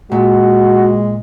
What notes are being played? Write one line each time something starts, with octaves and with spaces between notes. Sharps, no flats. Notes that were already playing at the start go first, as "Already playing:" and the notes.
A#2 G#3 F#4